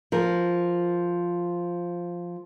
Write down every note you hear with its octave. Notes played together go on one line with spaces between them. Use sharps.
F3 A#4